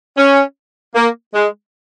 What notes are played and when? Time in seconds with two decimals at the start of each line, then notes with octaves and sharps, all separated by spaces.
0.17 C#4
0.95 A#3
1.34 G#3